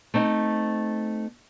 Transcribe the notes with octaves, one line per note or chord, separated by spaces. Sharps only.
A3 C4 D#4